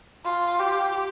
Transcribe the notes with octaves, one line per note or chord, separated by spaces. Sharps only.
F4
G4